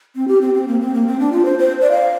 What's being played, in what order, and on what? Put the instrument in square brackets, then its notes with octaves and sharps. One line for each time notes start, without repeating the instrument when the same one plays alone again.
[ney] C4
G4
C4
C4
A#3
C4
A#3
C4
D4
F4
C5
C5
D5
F5